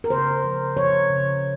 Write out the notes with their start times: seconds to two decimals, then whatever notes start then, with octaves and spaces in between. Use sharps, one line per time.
0.04 A#4
0.10 C#3 C5
0.44 F3
0.76 F3 C#5
1.10 C#3